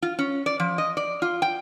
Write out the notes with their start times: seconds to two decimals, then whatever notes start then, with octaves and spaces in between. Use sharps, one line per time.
0.02 F4
0.19 C#4
0.46 D5
0.60 F3
0.78 D#5
0.97 D5
1.22 F4
1.42 G5